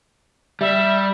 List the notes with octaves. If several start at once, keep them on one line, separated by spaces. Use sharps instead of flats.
G3 E5